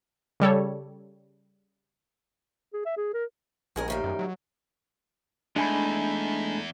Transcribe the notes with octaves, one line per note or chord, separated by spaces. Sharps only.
C#3 G3 A4 C#5
G#4
E5
G#4
A#4
A#1 G#3 G#4 A#4
A2 D#3 G3
F#2
F#3
E2 G#3 A3 D4 D#4 G#5 B5